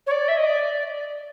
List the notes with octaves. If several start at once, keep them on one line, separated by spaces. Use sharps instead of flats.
C#5
D5
E5
D#5
D5